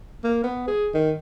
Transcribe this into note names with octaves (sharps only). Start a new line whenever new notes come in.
A#3
B3
G#4
D#3